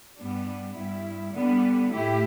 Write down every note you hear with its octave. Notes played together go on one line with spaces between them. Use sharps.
G2 G3 B3 D4
G2 G3 E4
D3 G3 B3 D4
A2 A3 E4 G4